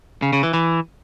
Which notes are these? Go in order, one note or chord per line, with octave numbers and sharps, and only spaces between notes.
C#3
C#3
E3
E3